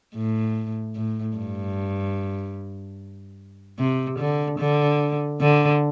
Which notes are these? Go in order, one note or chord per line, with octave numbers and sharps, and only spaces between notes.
A2
A2
G2
C3
D3
D3
D3